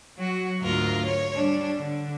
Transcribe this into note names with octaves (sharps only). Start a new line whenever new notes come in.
F#3 F#4
D2 G#2 F4 A#4
C#5
G3 D4
D3